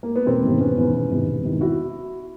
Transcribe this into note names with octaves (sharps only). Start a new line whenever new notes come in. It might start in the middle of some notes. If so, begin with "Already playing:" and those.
A#3
B3
E1 A#3 C4
E2 C3 D#3
E1 B3 C#4
E2 C3 D#3
E1
E2 C3 D#3
E1
E2 C3 D#3
E4 F#4